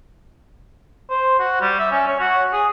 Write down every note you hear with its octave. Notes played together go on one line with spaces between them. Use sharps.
C5
F#4
G3
E5
C#4
C#5
F#4
G#4